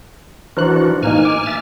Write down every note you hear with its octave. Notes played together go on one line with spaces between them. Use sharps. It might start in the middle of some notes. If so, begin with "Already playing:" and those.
E3 D4 F#4 A#4 C5 F#6
A2 A#3 D#4 G#5 F6
D6
E5 F6 A6